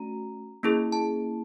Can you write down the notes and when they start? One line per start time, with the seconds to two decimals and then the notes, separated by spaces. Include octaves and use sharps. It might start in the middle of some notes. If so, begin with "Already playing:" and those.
Already playing: A3 C#4 F#4 A#5
0.63 A#3 C#4 E4 G#4
0.92 A5